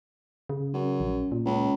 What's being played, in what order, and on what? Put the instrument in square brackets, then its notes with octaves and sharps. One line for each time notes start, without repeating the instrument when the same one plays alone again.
[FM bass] C#3
[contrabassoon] F#2
[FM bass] A#1
A#2
[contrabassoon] C#2